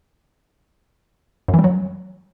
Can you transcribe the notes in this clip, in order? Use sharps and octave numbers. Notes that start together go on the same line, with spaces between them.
F#2
E3
G3
F#3